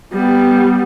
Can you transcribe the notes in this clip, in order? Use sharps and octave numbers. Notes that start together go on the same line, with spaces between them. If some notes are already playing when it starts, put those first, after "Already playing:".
G3 B3